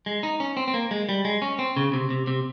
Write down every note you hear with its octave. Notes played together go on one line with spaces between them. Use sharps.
G#3
D#4
C#4
C4
C4
A#3
G#3
G3
G#3
C#4
C4
C#3
C3
C3
C3